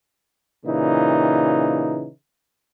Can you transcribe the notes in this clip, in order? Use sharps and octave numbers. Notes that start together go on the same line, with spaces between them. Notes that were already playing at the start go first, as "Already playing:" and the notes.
A#2 C#3 E3 D#4